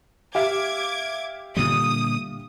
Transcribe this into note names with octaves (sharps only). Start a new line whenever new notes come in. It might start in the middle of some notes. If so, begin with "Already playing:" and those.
G4 E5 F5 D6 G#6
A#2 D3 G3 D#6